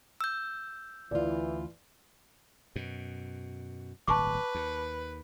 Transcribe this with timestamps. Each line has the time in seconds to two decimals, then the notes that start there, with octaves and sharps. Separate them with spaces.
0.21 E6 G6
1.11 D2 E3 F4 D5
2.76 F#2 B2
4.08 D1 G1 B4 A5 C#6 D6
4.55 D#2